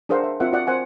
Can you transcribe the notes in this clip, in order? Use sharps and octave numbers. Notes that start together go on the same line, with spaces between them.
D4 G#4 A#4 C5 F5 F#5
E5
C4 F4 F#4 A#4 E5 F#5
F4 F#4 D5 F#5
C4 A#4 C5 F#5 G#5